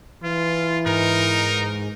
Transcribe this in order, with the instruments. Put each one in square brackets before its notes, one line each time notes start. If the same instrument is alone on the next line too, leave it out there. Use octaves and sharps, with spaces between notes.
[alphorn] E3 [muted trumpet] F4
[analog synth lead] G#2 [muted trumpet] D#4 [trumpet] A#4